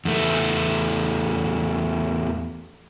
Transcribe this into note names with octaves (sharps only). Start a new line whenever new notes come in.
E2 A3